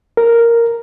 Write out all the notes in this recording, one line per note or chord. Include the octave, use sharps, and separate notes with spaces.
A#4